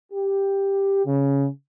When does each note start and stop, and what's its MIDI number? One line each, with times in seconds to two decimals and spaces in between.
0.12 1.02 67
1.05 1.46 49